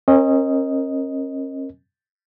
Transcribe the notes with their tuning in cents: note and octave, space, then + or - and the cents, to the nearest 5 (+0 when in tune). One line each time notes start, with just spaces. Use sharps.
C#4 -40 A#4 +0 D#5 +0